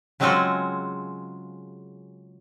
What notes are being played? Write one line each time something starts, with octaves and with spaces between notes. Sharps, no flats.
C#3 F#3 G#3 C4 F4 F#4